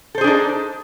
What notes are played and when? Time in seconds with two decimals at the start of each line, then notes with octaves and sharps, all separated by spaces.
0.15 A4
0.18 C5
0.21 G#4
0.24 D4
0.27 D#4